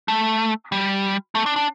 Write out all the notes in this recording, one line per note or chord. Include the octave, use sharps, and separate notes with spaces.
A3
G3
A3
D4
D4